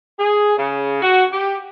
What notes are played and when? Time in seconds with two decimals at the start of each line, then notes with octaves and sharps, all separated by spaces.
0.18 G#4
0.58 C#3
1.02 F#4
1.32 G4